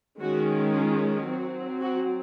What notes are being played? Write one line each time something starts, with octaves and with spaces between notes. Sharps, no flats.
D#3 G#3 C#4 F#4
F4
F#3 C4 F#4
F#4